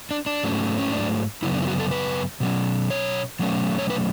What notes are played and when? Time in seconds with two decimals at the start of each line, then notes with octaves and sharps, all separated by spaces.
0.11 D4
0.26 D4
0.43 G#2 F#3 A3 C#4
0.79 C#4
0.92 D4
1.42 F#2 C#3 F#3 B3 E4
1.54 D4
1.62 E4
1.67 F#4
1.79 A4
1.91 B4
2.40 B2 F#3 C#4
2.90 C#5
3.39 B2 F#3 A3 C#4
3.79 C#5
3.90 B4